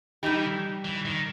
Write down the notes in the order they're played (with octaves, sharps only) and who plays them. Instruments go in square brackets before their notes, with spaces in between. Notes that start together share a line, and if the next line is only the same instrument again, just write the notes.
[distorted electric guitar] E3 [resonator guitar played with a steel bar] G3 D#4 G4
[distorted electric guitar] E3
D#3